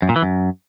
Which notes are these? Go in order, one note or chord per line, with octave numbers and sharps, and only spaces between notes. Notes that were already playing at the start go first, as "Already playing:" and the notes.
F#2
A#2
E3
F#2